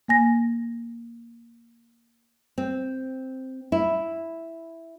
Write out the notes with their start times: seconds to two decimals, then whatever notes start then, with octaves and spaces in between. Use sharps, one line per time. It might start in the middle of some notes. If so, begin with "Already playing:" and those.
0.08 A#3 G#5 A#6
2.58 C4
3.72 E4